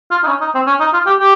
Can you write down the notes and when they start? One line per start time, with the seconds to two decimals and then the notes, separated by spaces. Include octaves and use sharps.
0.11 F4
0.24 D#4
0.28 C#4
0.41 D#4
0.55 C4
0.67 C#4
0.80 D#4
0.93 F4
1.06 G4
1.20 G4